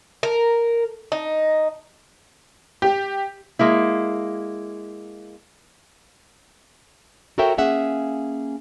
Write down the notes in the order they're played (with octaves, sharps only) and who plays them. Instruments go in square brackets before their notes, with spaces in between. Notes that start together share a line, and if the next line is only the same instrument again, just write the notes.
[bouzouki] A#4
D#4
[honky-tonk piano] G4
[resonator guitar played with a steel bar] G#3 A#3 E4
[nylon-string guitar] F#4 A4 A#4 C#5 E5 G5
A#3 C#4 G#4 E5 F#5